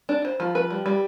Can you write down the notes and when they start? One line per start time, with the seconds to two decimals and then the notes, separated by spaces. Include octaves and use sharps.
0.09 D4
0.25 C5
0.40 F3
0.55 B4
0.70 G3
0.86 G3